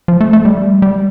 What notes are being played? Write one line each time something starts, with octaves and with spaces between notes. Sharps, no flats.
F3
A3
A3
G3
G3